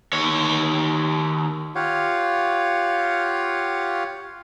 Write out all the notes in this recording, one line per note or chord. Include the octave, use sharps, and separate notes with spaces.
D#2 C#5
F4 G4 C#5 F5 F#5